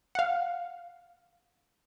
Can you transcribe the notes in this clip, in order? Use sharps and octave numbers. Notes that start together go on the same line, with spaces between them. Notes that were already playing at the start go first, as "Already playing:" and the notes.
F5 F#5